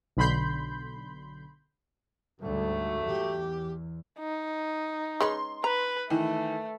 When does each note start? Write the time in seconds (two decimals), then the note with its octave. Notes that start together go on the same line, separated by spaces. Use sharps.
0.17 B1 D3 B5 C6 G6
2.41 D2 G#2 F#3 G3 A3
3.06 E2 G4
4.19 D#4
5.21 G#3 C#4 B4 C6
5.64 B4 A#5
6.10 D#3 E3 A3